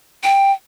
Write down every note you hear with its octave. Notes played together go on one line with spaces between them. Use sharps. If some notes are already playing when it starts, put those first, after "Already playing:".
G5